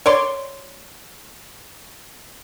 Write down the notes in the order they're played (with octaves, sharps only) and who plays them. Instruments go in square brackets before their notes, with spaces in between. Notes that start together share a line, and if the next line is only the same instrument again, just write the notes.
[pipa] C#5 D5 C6